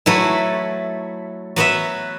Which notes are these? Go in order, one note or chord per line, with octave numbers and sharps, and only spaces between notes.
F#3 A3 E4 B4
F#3 B3 F#4 B4 E5